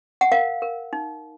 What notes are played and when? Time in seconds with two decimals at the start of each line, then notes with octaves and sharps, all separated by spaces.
0.21 F#5
0.32 A#4 F5
0.62 A#4
0.93 D#4